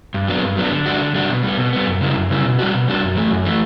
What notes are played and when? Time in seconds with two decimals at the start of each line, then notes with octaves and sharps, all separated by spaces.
0.14 G2
0.28 F#3 B3 D4
0.43 G2
0.57 F#3 B3 D4
0.71 D3
0.86 G3 D4 F#4
1.01 D3
1.15 G3 D4 F#4
1.30 B2
1.43 G3 B3
1.58 B2
1.73 G3 B3
1.86 F#2
2.01 C#3 G3 C#4 E4
2.16 F#2
2.30 C#3 G3 C#4 E4
2.45 B2
2.59 G3 D4 F#4
2.74 B2
2.88 G3 D4 F#4
3.02 F#2
3.16 E3 A3
3.31 F#2
3.45 E3 A3